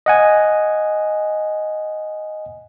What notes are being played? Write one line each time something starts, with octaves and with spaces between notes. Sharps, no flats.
D#5 F#5 G#5